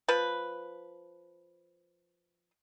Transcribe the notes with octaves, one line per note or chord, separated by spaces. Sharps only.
F3 B4